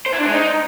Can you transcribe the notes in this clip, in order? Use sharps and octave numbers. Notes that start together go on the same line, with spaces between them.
C5
E4
D4
G#3
D#4